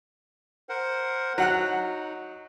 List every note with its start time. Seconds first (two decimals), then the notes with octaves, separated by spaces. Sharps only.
0.69 A#4 C5 F#5
1.38 F#3 D#4 F#5 F#6